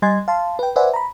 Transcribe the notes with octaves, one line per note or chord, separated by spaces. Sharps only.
G3 D#5 G#5 C6 G#6 A6
F5 A5 C6
B4 G5
B4 C5 D5 E5 F#5 G#5
A#5 B5